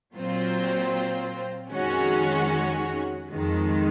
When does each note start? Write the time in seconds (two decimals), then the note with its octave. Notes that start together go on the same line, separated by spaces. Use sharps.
0.15 A#2 F#3 C4 F4 C5
1.72 F2 D#3 G#3 C#4 F#4
3.29 F2 D#3 G#3